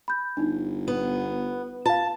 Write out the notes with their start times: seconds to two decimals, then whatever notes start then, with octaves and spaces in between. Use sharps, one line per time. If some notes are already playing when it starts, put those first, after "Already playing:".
0.08 B5 G6
0.37 G1 D4 D#4
0.88 B3
1.86 F4 F5 A5